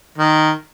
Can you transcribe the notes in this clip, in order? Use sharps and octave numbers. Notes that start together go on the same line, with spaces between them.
D#3